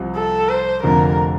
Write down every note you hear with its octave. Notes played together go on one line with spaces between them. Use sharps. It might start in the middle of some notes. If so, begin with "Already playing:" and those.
Already playing: C2 C3 F3
A4
C5
F1 F2 D3 A#4